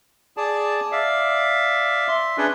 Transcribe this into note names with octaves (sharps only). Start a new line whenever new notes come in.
G#4 D5 A5
D5 E5 F5
E5 C6
C#4 D4 G#4 B4 C#5 D5